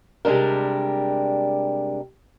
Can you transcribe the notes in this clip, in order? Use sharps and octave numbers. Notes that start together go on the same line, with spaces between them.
C3 G3 G#3 D4 A#4